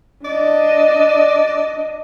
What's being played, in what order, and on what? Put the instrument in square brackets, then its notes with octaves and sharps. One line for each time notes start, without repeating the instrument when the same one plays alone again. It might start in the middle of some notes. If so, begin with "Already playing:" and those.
[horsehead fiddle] D4 D#5 [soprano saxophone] D5